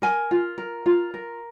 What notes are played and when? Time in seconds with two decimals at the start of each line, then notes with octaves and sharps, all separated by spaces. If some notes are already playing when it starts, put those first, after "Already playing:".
0.02 A#4 G#5
0.31 F4
0.58 A#4
0.86 F4
1.14 A#4